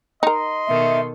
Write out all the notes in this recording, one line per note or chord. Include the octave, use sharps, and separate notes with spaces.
D#4 A#4 D#5 C6
B2 D#3 A4 E5